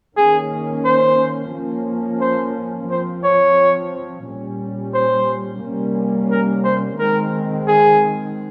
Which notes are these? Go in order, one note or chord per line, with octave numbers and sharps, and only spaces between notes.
D#3 A#3 C#4 G#4
C5
F3 A#3 C#4
C5
F3 C4 C5
C#5
A#2 G3 C#4
C5
C3 G3 A#3 C#4
A#4
C5
D#3 G#3 C4 A#4
G#4